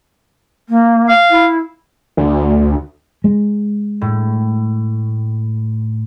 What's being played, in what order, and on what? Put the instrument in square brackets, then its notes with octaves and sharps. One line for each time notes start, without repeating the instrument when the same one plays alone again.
[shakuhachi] A#3
[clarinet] F5
[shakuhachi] E4
[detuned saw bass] D2
[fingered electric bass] G#3
[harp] A2